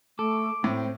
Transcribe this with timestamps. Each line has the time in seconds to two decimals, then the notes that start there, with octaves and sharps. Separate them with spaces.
0.19 A3 A4 D6
0.64 A2 C4 C5